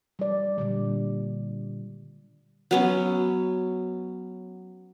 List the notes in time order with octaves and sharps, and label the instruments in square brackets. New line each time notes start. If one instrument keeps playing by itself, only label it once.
[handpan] G3 D5
A#2 D3 G3
[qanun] F#3 B3 C#4